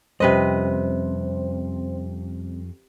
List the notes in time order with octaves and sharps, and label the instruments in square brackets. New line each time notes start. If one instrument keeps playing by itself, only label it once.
[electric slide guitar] F2 [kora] C3 B4 D#5 [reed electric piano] G3 C#4 [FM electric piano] C5